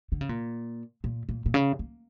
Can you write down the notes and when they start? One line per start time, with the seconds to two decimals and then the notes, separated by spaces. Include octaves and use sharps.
0.12 D3
0.21 C#3
0.29 A#2
1.04 A#2
1.29 A#2
1.46 A#2
1.54 C#3
1.79 A#3